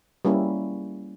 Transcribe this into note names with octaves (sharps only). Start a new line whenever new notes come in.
G3 A#3 C#4 E4